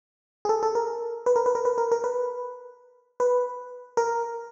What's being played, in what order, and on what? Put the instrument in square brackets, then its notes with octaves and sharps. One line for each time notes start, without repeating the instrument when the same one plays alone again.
[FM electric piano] G#4
A4
A4
A#4
B4
A#4
B4
A#4
B4
A#4
A#4
B4
B4
A#4